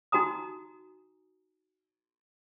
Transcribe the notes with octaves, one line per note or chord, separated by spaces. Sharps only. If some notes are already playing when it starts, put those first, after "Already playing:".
D#4 F#4 G#5 A#5 D#6